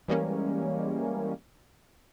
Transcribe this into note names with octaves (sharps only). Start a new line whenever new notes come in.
E3 G3 G#3 A#3 C#4